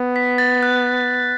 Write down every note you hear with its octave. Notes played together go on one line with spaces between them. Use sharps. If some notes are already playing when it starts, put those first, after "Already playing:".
Already playing: B3
B6
A6
F#6